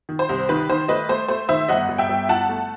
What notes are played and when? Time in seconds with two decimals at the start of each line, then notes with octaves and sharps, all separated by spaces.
0.09 D#3
0.19 C5
0.29 C2
0.49 D#3 B4
0.69 D#3 C5
0.88 A3 B4 D#5
1.09 A3 C5
1.28 A3 C5
1.49 D#3 C5 E5
1.68 G1 D#5 F#5
1.89 G1
1.98 E5 G5
2.09 G1
2.29 E4 F#5 A5
2.49 A3